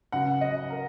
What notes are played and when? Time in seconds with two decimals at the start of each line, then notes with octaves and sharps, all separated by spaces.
0.12 C#2 C#3 F#3 F#5
0.41 D#5
0.70 A#4